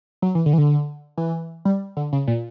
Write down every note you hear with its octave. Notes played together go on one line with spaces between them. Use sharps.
F#3
E3
D3
E3
D3
E3
G3
D3
C#3
A#2